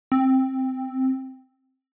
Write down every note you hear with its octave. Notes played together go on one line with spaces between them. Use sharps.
C4